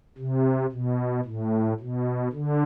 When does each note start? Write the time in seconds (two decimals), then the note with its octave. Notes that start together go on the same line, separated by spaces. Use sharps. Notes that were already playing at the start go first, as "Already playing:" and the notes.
0.18 C3
0.72 B2
1.25 A2
1.80 B2
2.33 D3